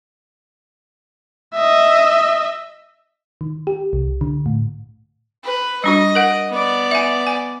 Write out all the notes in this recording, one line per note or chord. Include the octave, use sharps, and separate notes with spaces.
D#5 E5
D#3
G4
C2
D3
A2
B4
G3 D4 F#4 D#5
A#4 F#5
B3 D5
E5 G#5
G#5